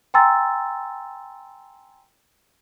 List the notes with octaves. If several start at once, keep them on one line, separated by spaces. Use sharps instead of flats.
G5 G#5 A#5 C6 E6 A6